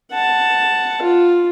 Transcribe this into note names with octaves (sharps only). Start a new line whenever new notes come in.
F#5 A5
F4